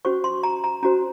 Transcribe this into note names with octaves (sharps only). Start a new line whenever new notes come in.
C#4 F#4 C5 C#6
C6
A#5
A#5
C#4 F#4 C5 A#5